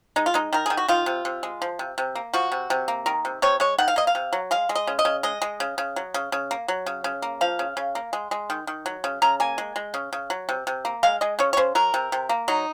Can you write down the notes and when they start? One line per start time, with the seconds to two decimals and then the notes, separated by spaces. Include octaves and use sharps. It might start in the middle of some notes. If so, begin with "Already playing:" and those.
0.16 G#3 D#4
0.26 F4
0.34 G#3 D#4
0.53 D#3 A#4
0.66 D#3 G#4
0.77 F#4
0.88 D#3 F4
1.06 C3
1.25 C3
1.43 G#3
1.62 F3
1.79 C3
1.98 C3
2.15 A#3
2.33 F3 F#4
2.52 C3
2.70 C3
2.88 A#3
3.06 D#3 A#4
3.25 C3
3.42 C3 C#5
3.60 G#3 C#5
3.78 D#3 F#5
3.88 F5
3.96 A#3 D#5
4.07 F5
4.15 C3
4.33 F#3
4.51 G#3 F5
4.69 G#3
4.75 D#5
4.87 C#3
4.99 D#5
5.05 C#3
5.23 G#3 D#5
5.42 G#3
5.60 C#3
5.78 C#3
5.96 F#3
6.14 C#3
6.32 C#3
6.51 A#3
6.68 F#3
6.86 C#3
7.04 C#3
7.22 A#3
7.41 F3 F5
7.59 C#3
7.77 C#3
7.95 A#3
8.13 G#3
8.31 G#3
8.50 D#3
8.67 D#3
8.86 F#3
9.04 C#3
9.22 C#3 A#5
9.40 A#3 G#5
9.58 G#3
9.76 G#3
9.94 C#3
10.13 C#3
10.30 F#3
10.49 C3
10.67 C3
10.85 A#3
11.03 G#3 F5
11.21 G#3 D#5
11.39 C#3 C#5
11.53 C#5
11.57 C#3 C5
11.75 F#3 A#4
11.94 C3
12.12 C3
12.29 A#3
12.48 F#3 D#4